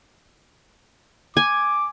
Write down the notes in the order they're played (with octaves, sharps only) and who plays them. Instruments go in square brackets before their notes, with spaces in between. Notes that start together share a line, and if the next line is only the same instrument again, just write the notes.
[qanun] G#5 [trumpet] D6